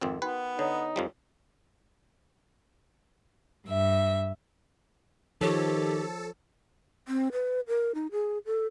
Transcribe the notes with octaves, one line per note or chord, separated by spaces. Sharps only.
G#1 F2 C4 A#4
B3 D#4 F#4 B4 G5
D3 D#4 C#5 D#6
F2 F3 G3
G2 E5
D#3 F3 G4 A4 C#5
C4
B4
A#4
D#4
G#4
A4